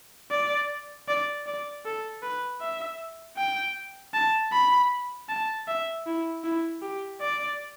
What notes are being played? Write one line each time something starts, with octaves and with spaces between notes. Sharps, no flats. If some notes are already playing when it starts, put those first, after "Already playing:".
D5
D5
D5
A4
B4
E5
G5
A5
B5
A5
E5
E4
E4
G4
D5